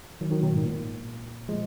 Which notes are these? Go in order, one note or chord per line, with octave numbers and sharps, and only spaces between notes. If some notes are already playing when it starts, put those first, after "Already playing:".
D#3 F#3
D#3 F#3
B2 D#3
G#2
A#2
F3 G#3